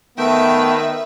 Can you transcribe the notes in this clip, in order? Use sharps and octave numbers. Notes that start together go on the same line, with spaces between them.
D#3 A3 B3 B4 E5 G5